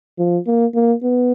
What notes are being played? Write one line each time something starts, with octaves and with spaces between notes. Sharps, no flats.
F3
A#3
A#3
B3